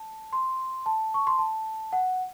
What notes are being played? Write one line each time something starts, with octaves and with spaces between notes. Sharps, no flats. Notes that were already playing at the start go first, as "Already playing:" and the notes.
Already playing: A5
C6
A5
C#6
C6
A5
F#5